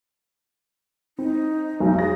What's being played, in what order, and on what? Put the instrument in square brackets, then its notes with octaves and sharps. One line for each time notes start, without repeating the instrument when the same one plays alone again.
[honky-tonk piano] C4 [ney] D#4
[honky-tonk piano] F1 B1
[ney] G#4 [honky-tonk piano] A#6